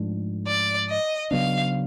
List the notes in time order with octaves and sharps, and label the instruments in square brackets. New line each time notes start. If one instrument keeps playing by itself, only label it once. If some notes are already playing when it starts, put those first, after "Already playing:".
Already playing: [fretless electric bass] G#2 F3 A3 D4
[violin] D5
D#5
[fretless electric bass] C#3 F#3 B3 D4 [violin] F5